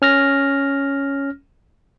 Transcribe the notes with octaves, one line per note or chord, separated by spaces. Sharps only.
C#4 F6 A#6